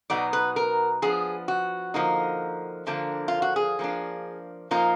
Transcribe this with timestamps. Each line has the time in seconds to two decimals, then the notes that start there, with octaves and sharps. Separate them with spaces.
0.10 B2 F#3 B3 D#4 D5
0.33 B4
0.56 A#4
1.02 F3 B3 D4 G#4
1.48 F#4
1.94 D3 F3 A#3 D#4
2.87 D3 F3 A#3 D4
3.28 F4
3.42 F#4
3.56 G#4
3.79 F3 A#3 D4
4.71 A#2 F3 A#3 D#4 F4